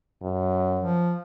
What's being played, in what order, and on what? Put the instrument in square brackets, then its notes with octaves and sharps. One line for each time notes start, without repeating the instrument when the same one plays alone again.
[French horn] F#2
[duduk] F3